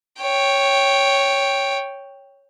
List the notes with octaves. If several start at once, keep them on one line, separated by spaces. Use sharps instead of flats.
C#5 G5